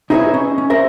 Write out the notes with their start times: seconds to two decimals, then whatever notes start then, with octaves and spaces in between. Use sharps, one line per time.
0.10 D#4 E4 G#4 A#4 B4 C#5
0.34 C#4
0.58 C#4
0.70 A#4 C5 E5